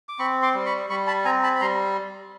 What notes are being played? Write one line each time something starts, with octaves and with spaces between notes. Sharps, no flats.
D6
C4 B5 C#6
C6 D6
G3
B5 C#6
G3 B5 C#6
A5 B5
C4 G#5 A#5
A5 B5
B5
G3 A#5 C6